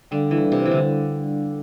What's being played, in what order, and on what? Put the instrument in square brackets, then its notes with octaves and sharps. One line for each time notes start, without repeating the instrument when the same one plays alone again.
[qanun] D3 [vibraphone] G3 D4 A4 D5 F5
[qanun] E3
C3
E3
D3